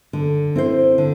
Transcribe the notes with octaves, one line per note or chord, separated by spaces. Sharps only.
D3
C4 E4 C5
D3